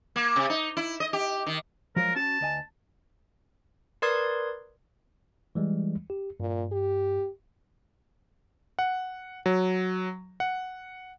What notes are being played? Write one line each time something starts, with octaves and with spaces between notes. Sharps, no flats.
A#3
C3
D#4
E4
D#5
G4
D#3
F3 F#3 G#3 A#4
C#4 F#4 A5
D2 D#5 G#5
A#4 B4 D5 C6 D#6 G#6
E3 G3 G#3
G4
G2 A#2
G4
F#5
F#3
F#5